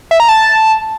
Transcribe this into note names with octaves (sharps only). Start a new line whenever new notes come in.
E5
A#5
A5